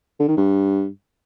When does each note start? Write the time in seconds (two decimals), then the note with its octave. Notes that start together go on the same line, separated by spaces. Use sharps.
0.19 D3
0.28 D#3
0.37 G2